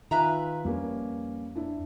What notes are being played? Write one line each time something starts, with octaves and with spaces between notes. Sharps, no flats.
D#3 D#4 F4 B4 E5 G#5 A#5
F2 G3 A#3 C#4
D4 E4